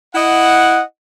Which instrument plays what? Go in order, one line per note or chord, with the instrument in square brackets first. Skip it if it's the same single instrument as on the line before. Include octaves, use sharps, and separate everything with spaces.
[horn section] E4 D#5 F#5